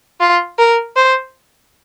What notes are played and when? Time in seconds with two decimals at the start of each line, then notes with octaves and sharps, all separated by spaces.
0.21 F4
0.59 A#4
0.96 C5